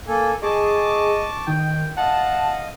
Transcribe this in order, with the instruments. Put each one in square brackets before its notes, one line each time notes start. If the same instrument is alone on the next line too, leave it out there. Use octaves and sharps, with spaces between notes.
[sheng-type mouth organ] A#3 A4 G#5
[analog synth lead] G#4 [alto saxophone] D#5 [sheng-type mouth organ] A5 C#6 D6
[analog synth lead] D#3 [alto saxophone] G5
[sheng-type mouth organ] D#5 F5 [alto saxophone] F#5 [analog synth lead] A5